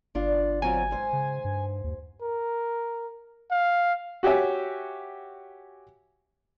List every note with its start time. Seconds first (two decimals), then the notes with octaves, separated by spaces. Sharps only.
0.15 G1 D4 F4
0.62 F#3 C4 F4 G#5
0.91 G#2 C5
1.13 C#3
1.44 G2
1.84 D#2
2.22 A#4
3.51 F5
4.23 F#4 G4 C#5 E5 G#5